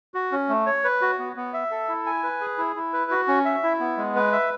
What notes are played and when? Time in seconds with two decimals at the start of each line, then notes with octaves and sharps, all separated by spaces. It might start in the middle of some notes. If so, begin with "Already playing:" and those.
0.14 F#4
0.32 C#4
0.49 A3
0.66 C#5
0.84 B4
1.02 F#4
1.19 B3
1.36 B3
1.53 E5
1.71 A4
1.89 E4
2.06 G#5
2.23 B4
2.41 G#4
2.58 E4
2.76 E4
2.93 B4
3.11 F#4
3.28 C#4
3.45 E5
3.63 E4
3.80 B3
3.98 G#3
4.16 B4
4.32 E5